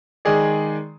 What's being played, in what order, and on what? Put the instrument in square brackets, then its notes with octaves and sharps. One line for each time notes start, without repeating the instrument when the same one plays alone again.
[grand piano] D#3 G#3 G#4 D5